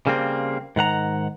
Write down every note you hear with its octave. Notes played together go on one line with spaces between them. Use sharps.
C#3 G3 A#3 C4
G#2 D#3 F#5 A#5